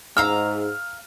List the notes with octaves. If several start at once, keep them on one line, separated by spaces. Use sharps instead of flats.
G#2 F5 A#5 E6 F6